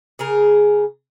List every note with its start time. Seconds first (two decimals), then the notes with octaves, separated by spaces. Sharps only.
0.19 C#3 G#4 A#4